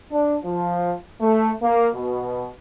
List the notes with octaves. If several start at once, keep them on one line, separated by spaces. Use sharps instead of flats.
D4
F3
A3
A#3
B2